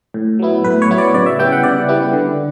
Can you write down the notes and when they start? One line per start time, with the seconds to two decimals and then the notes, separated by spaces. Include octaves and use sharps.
0.14 A2
0.39 F#3 B3 E4
0.65 A2 B4
0.82 C#5
0.90 F#3 B3 E4
0.98 D5
1.14 C#3 D5
1.26 E5
1.39 G3 B3 E4 G5
1.52 F#5
1.63 C#3 D5
1.88 G3 B3 E4
2.13 D3